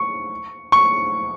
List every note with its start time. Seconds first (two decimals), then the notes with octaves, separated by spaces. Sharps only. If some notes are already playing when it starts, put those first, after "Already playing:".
Already playing: C#6
0.72 C#6